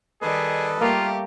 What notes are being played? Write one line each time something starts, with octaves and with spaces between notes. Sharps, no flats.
D#3 G3 G#4 A4 B4 D#5
G3 A3 A#3 F4 G4